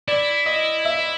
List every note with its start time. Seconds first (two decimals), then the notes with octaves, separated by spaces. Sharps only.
0.08 E4 D5
0.46 D#5
0.85 E5